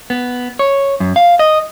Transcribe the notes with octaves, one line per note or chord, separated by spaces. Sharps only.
B3
C#5
F#2
F5
D#5